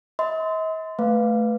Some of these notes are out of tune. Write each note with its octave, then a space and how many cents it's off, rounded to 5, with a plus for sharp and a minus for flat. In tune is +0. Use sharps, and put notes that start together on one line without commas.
D#5 +45 C6 -25
A3 +0 B4 +0 F5 +0